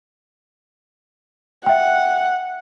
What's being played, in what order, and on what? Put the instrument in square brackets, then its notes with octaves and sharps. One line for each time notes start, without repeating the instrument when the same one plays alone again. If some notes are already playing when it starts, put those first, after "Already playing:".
[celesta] E5 G5 [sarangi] F#5